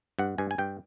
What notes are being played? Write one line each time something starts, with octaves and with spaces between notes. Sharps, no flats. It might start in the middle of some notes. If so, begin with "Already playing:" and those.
G2 F#5
G2 G#5
G#5
G2 G5